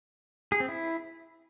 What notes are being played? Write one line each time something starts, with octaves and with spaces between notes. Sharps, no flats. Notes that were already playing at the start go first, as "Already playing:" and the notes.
G#4
C4
E4